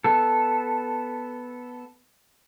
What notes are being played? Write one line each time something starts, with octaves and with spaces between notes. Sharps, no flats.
B3 A4